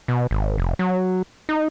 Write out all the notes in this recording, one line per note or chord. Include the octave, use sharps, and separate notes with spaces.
B2
G#1
F1
F#3
D#4